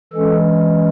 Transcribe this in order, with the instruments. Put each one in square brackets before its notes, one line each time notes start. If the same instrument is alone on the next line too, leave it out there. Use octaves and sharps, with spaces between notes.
[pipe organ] E3 G#3 C#4 A4